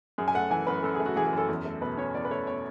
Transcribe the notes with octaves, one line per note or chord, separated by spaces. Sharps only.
F#2 G#4
G#5
A3 F#5
E3 G#5
F#2 B4
F#2 A4
G#4
A3
F#4
E3 G#4
G#4
F#2
A4
E2
A3
B2 B4
C#4 C#5
E2 D5
B4
A3 C#5
B2 C#5